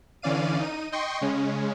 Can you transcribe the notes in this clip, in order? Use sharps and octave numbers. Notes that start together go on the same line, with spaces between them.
D3 E3 C#4 D5 F5 D#7
D#4 D#7
D#5 G5 C6 C#6
C#3 G#3 C#4